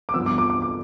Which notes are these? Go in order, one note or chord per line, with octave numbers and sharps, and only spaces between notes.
D6
G2 F3 B3 E6
D6
D6
D6
D6